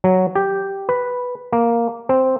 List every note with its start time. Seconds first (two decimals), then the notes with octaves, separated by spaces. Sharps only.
0.04 F#3
0.35 G4
0.89 B4
1.52 A#3
2.09 C4